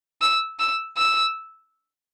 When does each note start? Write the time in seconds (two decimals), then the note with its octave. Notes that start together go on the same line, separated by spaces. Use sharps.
0.22 E6
0.59 E6
0.97 E6